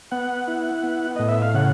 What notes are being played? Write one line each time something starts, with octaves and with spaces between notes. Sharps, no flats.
B3 F#5
E4
B3
A2 D#5
E5
F5
C#3 F#5